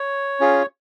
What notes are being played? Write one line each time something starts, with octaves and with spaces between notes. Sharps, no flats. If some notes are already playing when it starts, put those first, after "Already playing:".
Already playing: C#5
C#4 F4 G#4